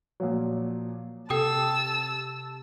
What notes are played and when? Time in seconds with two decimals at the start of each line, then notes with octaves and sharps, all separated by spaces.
0.20 A#2 F3 F#3
1.30 C3 G4 A4 G5 A5 D#6 E6